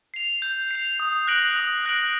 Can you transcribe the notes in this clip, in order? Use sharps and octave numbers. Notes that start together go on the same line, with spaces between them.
C7 F7
G6
C7 F7
D#6
F#6 A#6 D7 F#7
D#6
F#6 A#6 D7 F#7